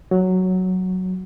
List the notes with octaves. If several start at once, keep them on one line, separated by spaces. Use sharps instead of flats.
F#3